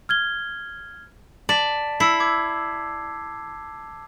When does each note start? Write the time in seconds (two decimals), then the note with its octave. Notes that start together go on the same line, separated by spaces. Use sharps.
0.09 F6 G#6 G7
1.49 D5 A5 B6
2.00 E4 E6 C7
2.20 D6 G#6